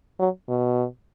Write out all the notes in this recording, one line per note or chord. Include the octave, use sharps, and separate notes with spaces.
F#3
B2